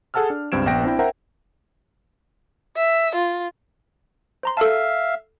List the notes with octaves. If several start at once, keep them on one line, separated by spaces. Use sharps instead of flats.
G#4 A4 F#5 A5 E6 F6
D4
C#2 G2 C4 G#6 D7 E7
A#1 B3 B4 G5 A#6 D7
C4 D4 E4 G5
A#4 C5 E5 F#5 G5 A#5
E5
F4
C5 A#5 C6
A4 E5 F5 A5